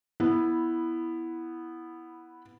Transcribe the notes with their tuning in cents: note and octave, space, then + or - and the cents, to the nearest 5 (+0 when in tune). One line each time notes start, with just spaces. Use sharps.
B3 -5 E4 +0